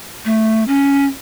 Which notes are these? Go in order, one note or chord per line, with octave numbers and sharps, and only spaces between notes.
A3
C#4